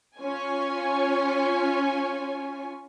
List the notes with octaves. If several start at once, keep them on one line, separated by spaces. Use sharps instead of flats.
C#4 F4 C#5 G#5